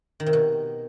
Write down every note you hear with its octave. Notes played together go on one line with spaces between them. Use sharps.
D#3
C3
B2